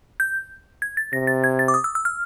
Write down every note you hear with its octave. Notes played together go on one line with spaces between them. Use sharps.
G6
G#6
A6
C3 A#6
A6
G#6
A6
D6
D#6
E6
E6
F6